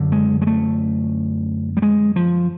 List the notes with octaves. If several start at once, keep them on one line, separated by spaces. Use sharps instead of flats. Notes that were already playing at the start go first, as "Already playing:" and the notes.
Already playing: F#2 D3
G#3
G#3
A3
G3
G#3
F3